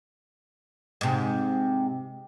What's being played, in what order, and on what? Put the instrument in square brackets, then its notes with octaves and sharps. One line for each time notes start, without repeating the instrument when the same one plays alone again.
[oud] G#2 C3